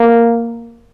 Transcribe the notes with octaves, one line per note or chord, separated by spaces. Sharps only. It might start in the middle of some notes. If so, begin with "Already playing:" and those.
Already playing: A#3